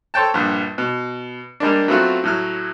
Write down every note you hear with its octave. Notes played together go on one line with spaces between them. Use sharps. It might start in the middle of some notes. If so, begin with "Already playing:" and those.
A4 C5 C#5 G5 A5
A#1 G2
B2
G3 G#3 A#3 D4
F#3 A3 B3 C4 F4 F#4
A2 F#3 F6